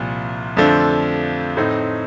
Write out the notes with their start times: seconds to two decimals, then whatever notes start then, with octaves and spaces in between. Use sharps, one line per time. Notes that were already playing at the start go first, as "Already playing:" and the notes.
Already playing: C2 A#2 F3
0.57 F2 D3 F3 A3 D4
1.57 A2 A3 C4 D#4